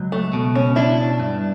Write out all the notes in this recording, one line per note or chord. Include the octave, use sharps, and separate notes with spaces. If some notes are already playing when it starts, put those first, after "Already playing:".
Already playing: C#2 F#3
A3
B2
C#4
D4 E4
G2